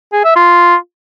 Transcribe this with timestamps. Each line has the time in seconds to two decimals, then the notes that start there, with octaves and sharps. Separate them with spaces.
0.13 G#4
0.24 E5
0.36 F4